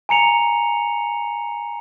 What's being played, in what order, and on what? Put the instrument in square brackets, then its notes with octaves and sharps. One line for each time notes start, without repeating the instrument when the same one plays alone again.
[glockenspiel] G#5 A#5 C#7 F7